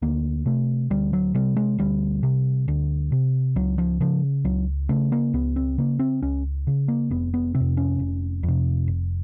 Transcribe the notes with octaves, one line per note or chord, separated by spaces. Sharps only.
D2 A#3
C3 A3
D2 G3
F#3
C3 G3
G#3
D2 G3
C3
D2
C3
C#2 F#3
F3
C#3 F3
C#2 F#3
C#3 A3
A#3
C#2 B3
C4
C#3 A#3
C4
C#2 C#4
C#3
A#3
F1 B3
B3
C3 C4
F2
C#4
F1
F2
C3
F1